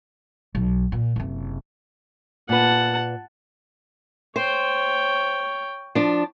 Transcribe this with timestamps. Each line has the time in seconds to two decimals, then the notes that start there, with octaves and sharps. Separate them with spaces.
0.55 B1
0.92 A#2
1.16 F#1 C3
2.49 A#2 B4 F#5 A5
4.36 C5 C#5 G5
5.95 F3 D4